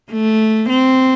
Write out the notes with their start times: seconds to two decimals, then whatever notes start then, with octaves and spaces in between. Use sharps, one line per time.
0.12 A3
0.69 C4